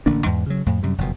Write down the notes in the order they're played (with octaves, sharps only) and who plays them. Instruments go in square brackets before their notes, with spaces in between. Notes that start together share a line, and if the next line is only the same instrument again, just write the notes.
[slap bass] A1 D3 A#3 D4
E2 G#2
C#3 F#3
F2 A2
F#2 C3 G3
F#1 F2 B2